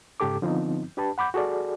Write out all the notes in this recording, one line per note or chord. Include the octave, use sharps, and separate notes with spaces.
G#2 C#3 G4 A4 D6
D3 F3 B3 C4 D#4
D4 G4 B4 A5
F#5 B5 D6 G6
F#4 G#4 A4 D5